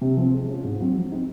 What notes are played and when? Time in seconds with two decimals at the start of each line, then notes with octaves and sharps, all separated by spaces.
0.01 C3
0.17 F3 C4
0.33 G#3
0.49 C#4 F4
0.64 G#2
0.80 F#3 C4
0.96 F3
1.12 C4 D#4